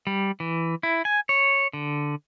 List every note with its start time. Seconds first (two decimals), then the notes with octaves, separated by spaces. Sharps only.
0.07 G3
0.40 E3
0.83 E4
1.05 G#5
1.29 C#5
1.73 D3